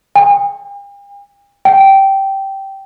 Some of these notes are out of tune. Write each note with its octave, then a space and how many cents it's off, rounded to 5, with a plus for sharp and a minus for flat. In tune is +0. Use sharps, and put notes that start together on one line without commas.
G5 +45
G5 -10